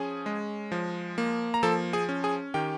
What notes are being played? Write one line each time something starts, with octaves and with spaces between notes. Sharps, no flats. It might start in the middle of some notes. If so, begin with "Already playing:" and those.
Already playing: F3 C#4 G#4 G#5
G#3
F3
A#3
A#5
F3 A4 A5
G#4 G#5
C#4
G#4 G#5
D#3 G4 G5